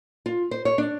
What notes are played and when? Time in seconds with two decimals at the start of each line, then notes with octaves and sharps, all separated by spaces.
0.26 F4
0.51 C5
0.65 C#5
0.78 D4